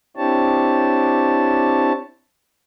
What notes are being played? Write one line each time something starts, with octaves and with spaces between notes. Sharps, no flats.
C4 D4 E4 G4 C#5 A5